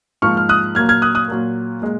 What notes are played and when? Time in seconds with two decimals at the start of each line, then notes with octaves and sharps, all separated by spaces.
0.22 G#2 F3 A#3 C#6 F6
0.37 F6
0.49 D#6 F#6
0.75 A#2 F#3 A#3 F6 G#6
0.89 F6 G#6
1.02 D#6 F#6
1.15 D#6 F#6
1.28 A#2 F#3 A#3
1.82 A#2 G#3